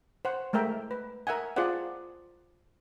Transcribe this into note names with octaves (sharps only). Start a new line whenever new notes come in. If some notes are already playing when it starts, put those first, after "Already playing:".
C5 F#5
G#3 A3 A#4 E5 G5
B4
A#4 E5 F#5 G#5
F4 G#4 C5 D5 F#5